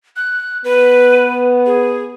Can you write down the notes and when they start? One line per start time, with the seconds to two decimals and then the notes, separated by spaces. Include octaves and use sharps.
0.16 F#6
0.64 B3 B4
1.66 G#4